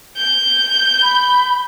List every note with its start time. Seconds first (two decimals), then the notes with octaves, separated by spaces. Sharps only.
0.17 G6
1.02 B5